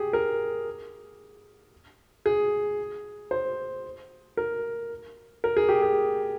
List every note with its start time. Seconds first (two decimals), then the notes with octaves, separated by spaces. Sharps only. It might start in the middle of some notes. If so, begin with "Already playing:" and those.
Already playing: G4 G#4
0.13 A#4
2.26 G#4
3.31 C5
4.37 A#4
5.44 A#4
5.57 G#4
5.69 G4
5.82 G#4